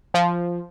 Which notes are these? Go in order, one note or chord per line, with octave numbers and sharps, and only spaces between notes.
F3